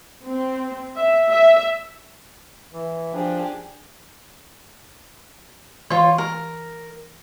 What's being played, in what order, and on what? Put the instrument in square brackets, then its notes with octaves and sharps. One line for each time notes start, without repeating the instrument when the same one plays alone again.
[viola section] C4
E5
E5
[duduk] E3
[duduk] F3 [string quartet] D4 G4 G#4
[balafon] E3 [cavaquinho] F4 C#5
[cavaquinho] A#4